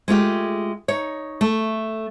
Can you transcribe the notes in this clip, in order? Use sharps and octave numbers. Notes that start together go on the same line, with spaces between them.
G#3 A3 F4 G4
D#4 C#5
A3